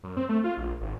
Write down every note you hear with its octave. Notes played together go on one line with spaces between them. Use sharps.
F#2
C4
A3
F4
A#1
G#1